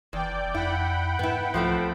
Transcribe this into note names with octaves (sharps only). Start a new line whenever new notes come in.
F#1 E2 D5 G5
F2 E4 F#5 G5 B5
G#2 B3 E4
C2 F3 A3 C4